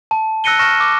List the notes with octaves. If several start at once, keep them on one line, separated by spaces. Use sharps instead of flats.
A5
E6 F#6 A#6 C#7 D#7 G7
C#6 F6 A#6 E7
D6